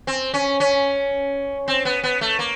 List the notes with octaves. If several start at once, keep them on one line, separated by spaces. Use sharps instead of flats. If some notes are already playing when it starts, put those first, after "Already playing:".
C4
C#4
C#4
C4
B3
B3
A3
A#3